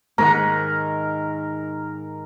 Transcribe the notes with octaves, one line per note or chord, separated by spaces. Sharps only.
G#2 D#3 A#4 F#5